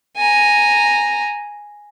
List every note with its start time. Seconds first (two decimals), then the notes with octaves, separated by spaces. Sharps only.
0.17 G#5 A#5